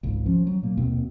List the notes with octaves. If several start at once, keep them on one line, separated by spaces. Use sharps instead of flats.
G#1 C#2
F3 C#4
F#3
A#2 A#3
D#2 B2 A#3 C4